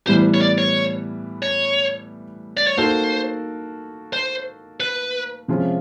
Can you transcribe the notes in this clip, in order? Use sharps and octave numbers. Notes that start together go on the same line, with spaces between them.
A2 E3 G3 B3 C5
C#5
D5
C#5
C#5
D5
C#5
A#3 D#4 F#4 A4 C5
C5
B4
C3 F3 G#3 C#4 F4